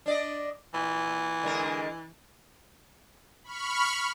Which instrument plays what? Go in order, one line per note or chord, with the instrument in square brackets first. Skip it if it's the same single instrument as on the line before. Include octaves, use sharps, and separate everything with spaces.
[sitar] D4 D5 D#5
[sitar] A#2 [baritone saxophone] E3
[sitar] D3 G#3 A#4
[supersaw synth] B5 C#6 F6